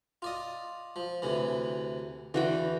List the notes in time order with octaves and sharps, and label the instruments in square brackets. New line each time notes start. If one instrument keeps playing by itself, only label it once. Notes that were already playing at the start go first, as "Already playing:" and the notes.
[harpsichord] F4 D5 D#5
F3
D2 C3 E3
[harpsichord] E2 D3 [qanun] E3 F#4 G5